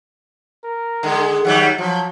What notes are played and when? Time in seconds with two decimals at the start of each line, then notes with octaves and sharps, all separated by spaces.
0.64 A#4
1.03 D3 G#3
1.45 D#3 F#3 G3 F#5
1.78 F3 F#3